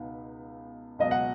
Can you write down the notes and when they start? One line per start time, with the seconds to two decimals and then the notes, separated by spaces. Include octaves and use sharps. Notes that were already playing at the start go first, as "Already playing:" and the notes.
Already playing: C#2 B2 B3 D#4
0.99 C#2 B2 F#3 D#5
1.11 F#5